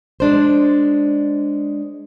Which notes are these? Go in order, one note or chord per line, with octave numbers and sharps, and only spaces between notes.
G#3 D4 C5